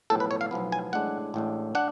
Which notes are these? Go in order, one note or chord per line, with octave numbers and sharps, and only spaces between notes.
B1 A2 F3 B3 A4
B4
C#5
F5
B1 A2 F3 B3
G#5
A1 A2 G#3 D4 F#5
A1 A2 G#3 D4
D4 F#5